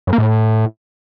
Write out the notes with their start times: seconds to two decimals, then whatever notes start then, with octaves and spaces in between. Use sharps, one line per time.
0.07 F#2
0.13 A#3
0.18 A2